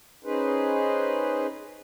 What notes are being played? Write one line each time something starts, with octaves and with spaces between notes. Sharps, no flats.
C#4 D#4 G#4 B4 C5